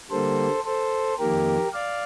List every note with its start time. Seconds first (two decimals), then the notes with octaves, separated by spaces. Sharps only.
0.11 D3 G3 A#3 A4 C5
0.64 A4 C5
1.19 F2 D#3 A#3 G4 A#4
1.73 D5 F5